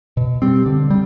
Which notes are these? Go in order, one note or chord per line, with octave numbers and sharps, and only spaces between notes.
B2
G3 C4
D3
G3